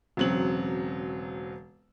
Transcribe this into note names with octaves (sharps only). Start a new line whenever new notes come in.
E1 C#3 F#3 C4 F#7